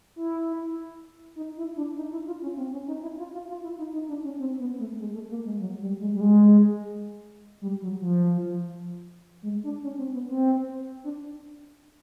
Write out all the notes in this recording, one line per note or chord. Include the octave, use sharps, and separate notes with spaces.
E4
D#4
E4
D4
D#4
E4
F4
C#4
C4
C#4
D#4
E4
F4
F4
F4
E4
D#4
D#4
D4
C#4
C4
B3
A3
G#3
A3
A#3
G#3
F#3
G3
G#3
G3
G#3
G3
F#3
F3
G#3
D4
C#4
C4
B3
C4
D4